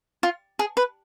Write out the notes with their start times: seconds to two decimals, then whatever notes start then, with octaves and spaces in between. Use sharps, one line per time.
0.23 F4
0.59 G#4
0.77 B4